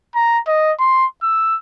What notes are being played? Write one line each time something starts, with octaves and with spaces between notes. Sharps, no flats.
A#5
D#5
C6
E6